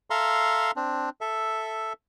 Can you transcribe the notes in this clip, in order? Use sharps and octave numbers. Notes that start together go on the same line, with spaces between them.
A4 E5 F5 A#5 C6
C4 D4
A4 E5